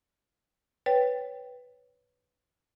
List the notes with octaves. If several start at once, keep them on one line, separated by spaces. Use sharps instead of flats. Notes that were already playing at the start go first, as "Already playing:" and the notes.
B4 C#5 G5